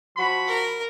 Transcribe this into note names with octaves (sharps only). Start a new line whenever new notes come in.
F3 F#4 B5
A#4